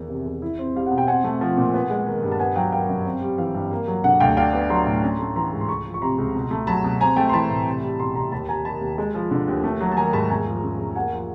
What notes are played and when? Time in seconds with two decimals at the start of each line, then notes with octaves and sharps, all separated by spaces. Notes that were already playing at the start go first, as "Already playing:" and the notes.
Already playing: E2 D#3
0.09 C3
0.26 E2
0.42 E4
0.59 C4
0.75 G3 F5
0.86 B2 F#5
0.98 G5
1.07 C4 F#5 G#5
1.24 A3
1.41 F3
1.57 A#2
1.74 B3
1.90 G#3
2.07 D#3
2.23 G2
2.32 A5
2.39 B3 F#5 G#5
2.56 F#3 F5 G5
2.72 D#3 F5 G5
2.88 F#2
3.05 C4
3.21 G3
3.38 E3 F5
3.55 G2
3.71 A#3
3.88 F#3
4.04 D3 F#5
4.20 D2 F5 G5
4.37 D4 F5 G5
4.53 B3
4.70 F#3 A#5 C6
4.86 A2
5.03 C#4
5.19 A3
5.36 E3 A#5 C6
5.52 G#2
5.61 C6
5.69 C#2 B5 C#6
5.85 F3
5.94 C#6
6.01 C3 A#5 C6
6.18 C#2
6.35 B2
6.51 A3
6.67 F#3 A5 B5
6.84 B2
7.00 C4 G#5 A#5
7.16 A3 G5 A5
7.29 C6
7.33 E3 A5 B5
7.50 A2
7.66 C2
7.83 G3
7.99 B2 A#5 C6
8.15 C2 A#5 C6
8.32 D#2 A5 B5
8.49 G3 G#5 A#5
8.65 D#3 A5 B5
8.81 D#2
8.98 G#3
9.15 F3
9.31 D3
9.48 D#2
9.64 A3
9.81 F#3
9.92 A5
9.97 D#3 G#5 A#5
10.13 G#2 A5 B5
10.30 E2 G#5 A#5
10.46 F3
10.63 C#3
10.79 E2
10.96 A#3 F#5 G#5
11.12 F3